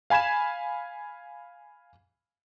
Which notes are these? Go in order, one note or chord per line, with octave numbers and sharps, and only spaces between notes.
F5 G#5 B5 G#6 E7